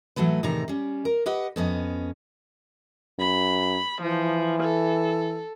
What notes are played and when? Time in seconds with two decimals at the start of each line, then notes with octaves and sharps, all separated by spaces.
0.16 A2 E3 F#3 A3 B4
0.43 E2 A2 C3 D#3 D#4 A#5
0.68 G3 C#4
1.05 A#4
1.26 G4 B4 D#5 F#5
1.56 F2 B3 C#4 D#5
3.19 F#2 B5
4.02 E3 F3
4.62 A4